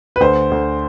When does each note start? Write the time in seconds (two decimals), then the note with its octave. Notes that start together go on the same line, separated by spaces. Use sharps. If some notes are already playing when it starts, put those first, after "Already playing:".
0.16 B4
0.20 D2 C5
0.51 D2